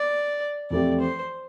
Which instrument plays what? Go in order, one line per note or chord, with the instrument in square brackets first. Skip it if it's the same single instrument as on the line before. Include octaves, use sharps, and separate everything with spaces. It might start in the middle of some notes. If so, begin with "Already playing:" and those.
Already playing: [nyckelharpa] D5
[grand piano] F2 E3 A3 C4 G4 [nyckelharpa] D5
[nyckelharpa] C5